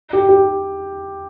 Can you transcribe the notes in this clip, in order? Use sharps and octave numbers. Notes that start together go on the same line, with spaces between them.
G4
G4